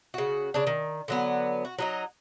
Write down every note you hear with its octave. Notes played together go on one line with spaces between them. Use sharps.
C#3 F#4
C#3 D4
D#3
D3 F#3 B3
F#4
F#3 D#4 D#5